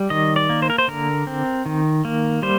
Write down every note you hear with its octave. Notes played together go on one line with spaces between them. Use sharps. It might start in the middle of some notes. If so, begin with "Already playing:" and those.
Already playing: G3
D#3 D#5
D5
A#3
C5
A#4
C5
D3 A#4
C4
D#3
A#3
G3 C5